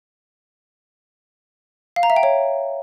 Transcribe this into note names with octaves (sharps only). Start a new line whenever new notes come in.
F5
A#5
E5
G5
C#5